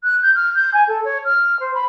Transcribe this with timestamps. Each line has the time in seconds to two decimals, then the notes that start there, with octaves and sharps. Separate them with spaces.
0.03 F#6
0.22 G6
0.35 F6
0.54 G6
0.73 G#5
0.88 A4
1.04 C#5
1.24 F6
1.59 C5
1.74 B5